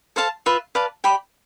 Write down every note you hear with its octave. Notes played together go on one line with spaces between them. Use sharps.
A4 C5 F5 A5
F4 B4 E5
B4 D5 F5 A5
G4 D5 G5 B5